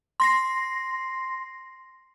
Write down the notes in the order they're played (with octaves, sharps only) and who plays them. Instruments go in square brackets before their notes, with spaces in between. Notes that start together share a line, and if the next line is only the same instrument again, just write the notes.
[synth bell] C6 A#6 C7